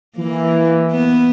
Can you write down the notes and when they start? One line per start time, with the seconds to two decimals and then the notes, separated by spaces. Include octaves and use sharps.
0.16 E3 A#3
0.91 B3